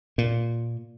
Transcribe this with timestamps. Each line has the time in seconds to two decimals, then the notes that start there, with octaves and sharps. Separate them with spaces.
0.18 A#2